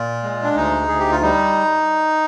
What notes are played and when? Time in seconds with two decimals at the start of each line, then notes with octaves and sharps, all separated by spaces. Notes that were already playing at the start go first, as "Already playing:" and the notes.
Already playing: A#2 F4
0.23 G#3
0.43 D4
0.56 D2 D#4
0.88 D2 G#4
0.99 G4
1.11 F4
1.22 G3 D#4